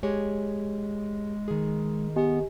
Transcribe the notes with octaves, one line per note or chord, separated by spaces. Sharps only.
G#3 G4 G#4 C#5
D#3 G#4
B3 G4 D#5 G#5